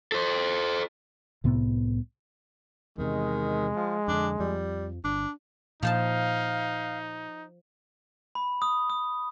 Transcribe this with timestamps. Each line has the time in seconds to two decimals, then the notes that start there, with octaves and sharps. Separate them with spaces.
0.12 A4 C5
1.44 C2 A2 C3 B3
2.98 E2 C3 D#3 G#3
3.76 F3
4.08 F2 D3 D4
4.39 F2 F3 G3
5.04 G1 D4
5.83 A#2 F3 D#4 C5 F5 A5
8.35 B5
8.62 D#6
8.90 D#6